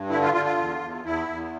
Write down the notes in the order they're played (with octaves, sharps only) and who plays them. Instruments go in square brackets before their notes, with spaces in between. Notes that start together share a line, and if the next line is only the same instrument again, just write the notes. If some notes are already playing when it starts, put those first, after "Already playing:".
Already playing: [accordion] G2
D3 E4
F4
D3 F4
F4
E2
E2
E2 E4
E2